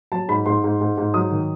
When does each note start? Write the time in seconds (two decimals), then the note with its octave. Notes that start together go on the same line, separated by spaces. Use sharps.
0.12 F#3 A5
0.28 G#2 B5
0.46 G#2 C6
0.64 G#2
0.81 G#2
0.97 G#2
1.14 F#3 D#6
1.31 D#3